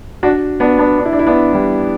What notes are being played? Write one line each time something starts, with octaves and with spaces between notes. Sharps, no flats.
D4 F#4
B3 D4
B3 D4
D4
E4
D4
E4
B3 D4
E3 G3